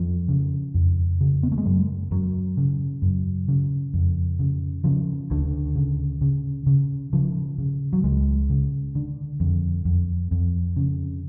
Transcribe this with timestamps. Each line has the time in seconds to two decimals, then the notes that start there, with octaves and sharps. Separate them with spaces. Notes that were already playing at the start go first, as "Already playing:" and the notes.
Already playing: F2 F3
0.28 C#3
0.74 F2
1.21 C#3
1.43 B3
1.52 A3
1.58 G#3
1.65 F#2 F#3
2.11 F#2 F#3
2.57 C#3
3.02 F#2
3.48 C#3
3.94 F2
4.39 C#3
4.84 C#3 F3
5.31 D2 D3
5.76 C#3
6.21 C#3
6.66 C#3
7.13 C#3 F3
7.58 C#3
7.93 F#3
8.04 C#2 G#3
8.50 C#3
8.95 D3
9.40 F2
9.85 F2
10.31 F2
10.76 C#3